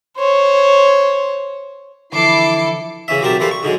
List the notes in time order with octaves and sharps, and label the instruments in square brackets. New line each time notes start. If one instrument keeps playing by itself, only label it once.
[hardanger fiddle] C5 C#5
[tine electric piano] D3 E3 F3 [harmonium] E4 [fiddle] A4 [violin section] D6 C7
[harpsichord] C#3 E3 C#4 E5
B1 F#3 C4 G4 A#4 A5
E3 G3 A#3 A4 B4 C5
C#6
G#2 D3 F#3 G#3